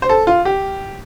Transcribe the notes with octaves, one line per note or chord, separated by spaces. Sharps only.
C5
A4
F4
G4